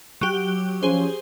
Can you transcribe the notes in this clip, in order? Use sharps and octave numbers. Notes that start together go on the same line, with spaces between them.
F#3 G4
F3 C#4 G#4 C5